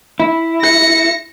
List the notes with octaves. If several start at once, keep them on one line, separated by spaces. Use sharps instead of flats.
E4
A#6 C#7